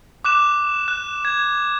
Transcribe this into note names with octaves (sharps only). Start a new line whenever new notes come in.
D6 F#6 E7
F#6
G#6